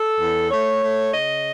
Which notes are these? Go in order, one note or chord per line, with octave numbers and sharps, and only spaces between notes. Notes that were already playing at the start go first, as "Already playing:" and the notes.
Already playing: A4
E2
A3 C#5
A3
C#3 D#5